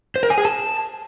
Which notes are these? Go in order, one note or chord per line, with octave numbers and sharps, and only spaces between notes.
C5
A#4
G#5
G#4
A5